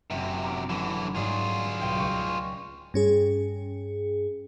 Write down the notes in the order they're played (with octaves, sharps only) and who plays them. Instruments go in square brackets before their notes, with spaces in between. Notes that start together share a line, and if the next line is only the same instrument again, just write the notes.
[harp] F#1 [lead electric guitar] F#2 C3
[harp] A#5 D6
[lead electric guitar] D3 E3 [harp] F#3
[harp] G#2 F#3 G3 [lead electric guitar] F4 G#4
[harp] B1 G5 G6
C#2 C#6
[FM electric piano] G2 C#4 G#4